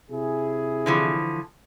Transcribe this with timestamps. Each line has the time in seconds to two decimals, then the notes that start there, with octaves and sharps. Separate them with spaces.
0.11 C3 E4 G#4
0.86 D3 E3 F3